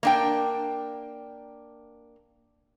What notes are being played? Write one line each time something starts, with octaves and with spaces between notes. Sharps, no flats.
A#3 D4 G5